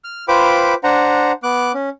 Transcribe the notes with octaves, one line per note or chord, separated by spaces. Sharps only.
F6
F4 B4 C5 G5 B5 D6
D4 C5 F#5 A#5
B3 D6 F#6
C#4